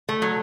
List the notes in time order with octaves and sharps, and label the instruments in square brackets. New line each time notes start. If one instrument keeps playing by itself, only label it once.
[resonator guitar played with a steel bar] A3
F#3